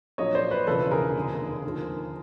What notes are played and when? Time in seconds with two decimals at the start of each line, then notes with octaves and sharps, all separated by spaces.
0.18 A#1 A#2 F#3 C#5 D#5
0.34 C5 D5
0.51 B4 C#5
0.67 E1 E2 C#3 F3 A4 B4
0.91 G#4 A#4
1.15 F1 D#2 D3
1.64 D#2 D3 F3